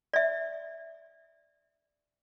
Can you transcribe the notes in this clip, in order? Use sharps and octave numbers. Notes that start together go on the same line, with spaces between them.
D5 E5